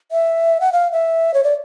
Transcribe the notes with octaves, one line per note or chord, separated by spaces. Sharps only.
E5
F#5
F5
E5
C#5
D5